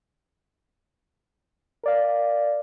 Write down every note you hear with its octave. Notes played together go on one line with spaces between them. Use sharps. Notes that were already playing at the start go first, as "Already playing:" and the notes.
A#4 D5 F5